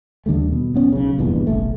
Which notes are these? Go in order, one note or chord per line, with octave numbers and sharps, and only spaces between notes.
D#2 D3 G3 A3
B2
D1 B3 C#4
B1 C#3
F1 A#1 E2 G2
F#1 B1 A3